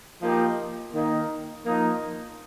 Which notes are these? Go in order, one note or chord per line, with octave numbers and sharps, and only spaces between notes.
F3 A#3 D#4 G4
D#3 A#3 D#4
F3 A#3 D#4